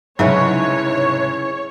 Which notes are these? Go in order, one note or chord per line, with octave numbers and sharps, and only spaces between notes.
C2 G#2 C#3 E3 F#3 C#4 E4 C#5